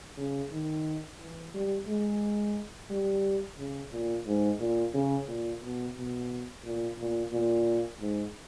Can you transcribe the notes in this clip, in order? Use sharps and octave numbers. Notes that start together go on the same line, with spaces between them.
C#3
D#3
E3
G3
G#3
G3
C#3
A#2
G#2
A#2
C#3
A#2
B2
B2
A#2
A#2
A#2
G#2